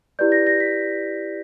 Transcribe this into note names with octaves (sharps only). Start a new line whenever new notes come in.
E4 G4 B4 D5 G6
A#6
A#6
B6